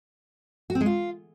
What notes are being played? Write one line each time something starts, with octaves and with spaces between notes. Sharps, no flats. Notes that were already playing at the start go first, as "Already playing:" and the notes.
F#4
C4
G#3
F4